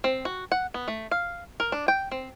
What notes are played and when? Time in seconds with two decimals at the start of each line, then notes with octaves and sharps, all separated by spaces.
0.04 C4
0.25 F#4
0.52 F#5
0.74 B3
0.88 A3
1.11 F5
1.60 A#4
1.72 D4
1.88 G5
2.12 C4